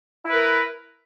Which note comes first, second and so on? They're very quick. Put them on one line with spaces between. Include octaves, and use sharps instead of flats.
E4 B4 A#4